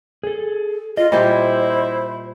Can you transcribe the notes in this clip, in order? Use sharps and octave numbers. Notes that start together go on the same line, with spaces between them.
G#4 A4
F4 D#5
A#2 G3 E4 G4 C5 D#5